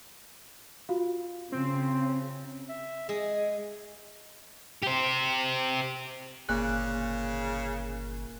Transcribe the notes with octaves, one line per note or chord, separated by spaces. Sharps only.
F4 F#4 F5
C#3 C4
E5
G#3 G#4
G4 C5
G1 A#2 C#3 F#6